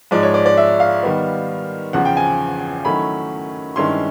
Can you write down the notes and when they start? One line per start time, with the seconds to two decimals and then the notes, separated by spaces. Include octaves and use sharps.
0.11 G#2 F3 G#3 D5
0.23 C#5
0.34 D5
0.46 D5
0.57 E5
0.80 F5
1.03 D#3 G3 B3
1.93 E2 C#3 F3 F#5
2.05 G5
2.17 G#5
2.85 D#3 F#3 A3 C#4 E4 B5
3.76 G2 D#3 G#3 C#4 E4 C6